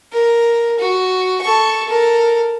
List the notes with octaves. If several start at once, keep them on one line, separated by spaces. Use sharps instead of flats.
A#4
F#4
A4 C#6
A4 A#4